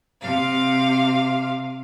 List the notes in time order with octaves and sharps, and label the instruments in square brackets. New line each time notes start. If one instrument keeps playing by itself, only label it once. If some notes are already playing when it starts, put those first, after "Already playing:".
[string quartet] C3 F5